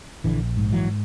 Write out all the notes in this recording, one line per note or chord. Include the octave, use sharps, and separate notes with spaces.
A#1 D3 E3
G#2
E3 F#3